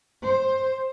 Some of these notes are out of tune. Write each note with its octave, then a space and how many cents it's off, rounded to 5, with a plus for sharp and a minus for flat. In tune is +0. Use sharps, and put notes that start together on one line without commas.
C5 +15